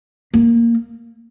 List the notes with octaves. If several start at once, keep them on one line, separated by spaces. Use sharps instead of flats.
A#3